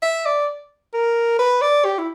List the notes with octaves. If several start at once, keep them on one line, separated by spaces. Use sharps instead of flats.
E5
D5
A#4
B4
D5
G4
E4